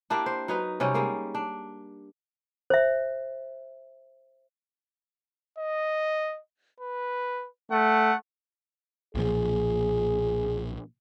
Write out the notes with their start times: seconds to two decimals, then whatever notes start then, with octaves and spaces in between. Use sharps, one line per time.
0.10 A#3 D4 E4 G4
0.26 C5
0.48 F#3 D#4 B4
0.80 C3 G3 C#4 D#4
0.94 G3 G#3 A#3
1.35 D4
2.70 C5 E5
5.58 D#5
6.80 B4
7.72 A3 F#5
9.15 B1 A#2 F3 G#4